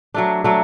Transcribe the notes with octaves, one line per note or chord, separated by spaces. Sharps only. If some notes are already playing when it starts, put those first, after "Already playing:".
F#3 A3 D4
F#3 A3 D4